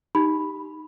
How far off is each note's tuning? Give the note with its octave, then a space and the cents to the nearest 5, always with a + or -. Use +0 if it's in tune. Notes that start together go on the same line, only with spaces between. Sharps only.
D#4 +0 G4 +0 B5 +0